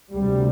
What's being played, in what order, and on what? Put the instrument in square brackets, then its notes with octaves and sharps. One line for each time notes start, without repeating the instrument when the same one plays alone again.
[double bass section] D2 C3 G3